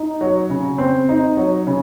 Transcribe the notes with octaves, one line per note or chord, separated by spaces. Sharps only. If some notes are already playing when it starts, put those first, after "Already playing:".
Already playing: D#4
F#3
C#3
C4
D#4
F#3
C#3